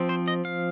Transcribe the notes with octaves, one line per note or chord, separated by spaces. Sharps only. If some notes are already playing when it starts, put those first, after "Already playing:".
Already playing: F3 C4
C5
D#5
F5